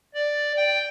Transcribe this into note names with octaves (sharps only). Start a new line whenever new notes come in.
D5
G5